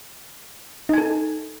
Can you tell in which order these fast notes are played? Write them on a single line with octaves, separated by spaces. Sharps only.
D#4 G#5 A4